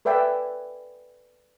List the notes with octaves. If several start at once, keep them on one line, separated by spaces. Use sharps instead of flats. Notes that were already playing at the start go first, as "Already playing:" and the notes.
A4 B4 D5 E5 G5 G#5